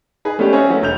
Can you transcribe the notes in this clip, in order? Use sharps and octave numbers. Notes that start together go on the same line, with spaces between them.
D#4 G#4 B4
G#3 A3 B3 C#4 D4 G4
C4 C#4 C#5 D#5 E5
F#3 A3
E1 G6 F7